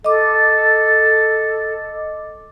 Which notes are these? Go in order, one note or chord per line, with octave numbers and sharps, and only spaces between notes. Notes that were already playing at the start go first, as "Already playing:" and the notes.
A4 D#5 D6